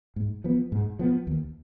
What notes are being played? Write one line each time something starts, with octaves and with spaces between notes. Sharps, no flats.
G#2
F3 B3
G#2
F3 B3
D#2